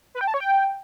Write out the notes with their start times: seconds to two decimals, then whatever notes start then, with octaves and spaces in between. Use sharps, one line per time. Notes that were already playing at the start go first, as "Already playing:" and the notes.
0.15 B4
0.21 G5
0.27 A5
0.34 C#5
0.40 G5